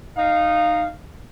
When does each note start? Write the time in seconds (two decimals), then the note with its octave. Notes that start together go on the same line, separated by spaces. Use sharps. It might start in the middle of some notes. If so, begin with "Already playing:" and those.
0.17 D#4 F5